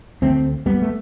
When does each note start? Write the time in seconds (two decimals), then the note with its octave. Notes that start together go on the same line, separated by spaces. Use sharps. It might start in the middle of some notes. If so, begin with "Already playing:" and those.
0.22 D2 D3 A3 C4
0.66 G3 B3
0.82 A3